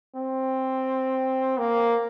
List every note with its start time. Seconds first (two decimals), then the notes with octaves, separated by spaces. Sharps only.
0.16 C4
1.58 A#3